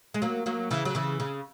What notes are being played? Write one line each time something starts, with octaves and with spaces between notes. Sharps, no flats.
G#3
F#3 A#3
F#3 A#3
C#3 E3
F#3
C#3 E3
C#3